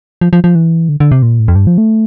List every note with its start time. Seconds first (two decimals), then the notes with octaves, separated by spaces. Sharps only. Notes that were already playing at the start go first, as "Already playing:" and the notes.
0.21 F3
0.33 F3
0.44 F3
0.55 E3
0.89 D3
1.00 D3
1.12 C3
1.22 A#2
1.39 A2
1.48 F2
1.55 G2
1.67 F3
1.78 A3